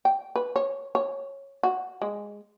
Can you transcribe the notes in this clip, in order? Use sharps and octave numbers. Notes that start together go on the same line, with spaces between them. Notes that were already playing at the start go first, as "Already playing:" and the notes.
G5
B4
C#5
C#5
F#4
G#3